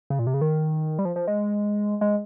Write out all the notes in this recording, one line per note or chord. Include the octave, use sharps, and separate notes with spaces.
C#3
A#2
C3
C#3
D#3
G3
F3
F3
G#3
G#3